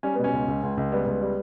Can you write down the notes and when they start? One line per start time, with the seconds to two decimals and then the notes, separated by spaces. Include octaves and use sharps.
0.03 G3 C#4
0.14 B2 B3
0.24 C#4
0.33 C#2
0.48 C#2
0.63 C#2
0.77 C#2
0.92 G3 B3
1.07 C#2
1.21 G3